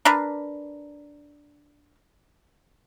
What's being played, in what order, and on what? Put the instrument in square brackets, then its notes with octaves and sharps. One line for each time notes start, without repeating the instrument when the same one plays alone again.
[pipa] D4 A#4 B4